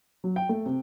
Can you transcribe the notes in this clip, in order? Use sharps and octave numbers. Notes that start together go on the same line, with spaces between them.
F#3
G5
A3
C3